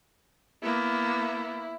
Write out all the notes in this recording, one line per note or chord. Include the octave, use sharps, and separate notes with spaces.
A#3 B3 E4